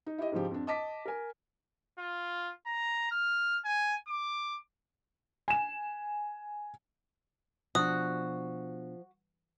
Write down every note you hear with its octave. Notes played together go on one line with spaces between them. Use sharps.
D#4
E4 G4 D#5
G#2 C#3 F3 G4
F2 D4
D#5 A5 D6 B6
A#4 G#5
F4
A#5
F6
G#5
D6
G#5 E7
B2 F3 D4 F#4 D#6